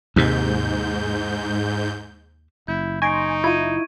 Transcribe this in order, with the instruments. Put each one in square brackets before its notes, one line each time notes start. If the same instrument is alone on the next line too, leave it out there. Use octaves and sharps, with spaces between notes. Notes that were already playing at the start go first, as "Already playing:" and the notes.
[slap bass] D#2 C3 [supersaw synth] G#2 G6
[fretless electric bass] F#1 [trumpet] E4 [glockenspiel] G6
[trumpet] D#4 [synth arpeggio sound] G#5 C6 [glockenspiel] C#6 A#6 D7
[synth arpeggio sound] E4 F4 [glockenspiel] G#6 D#7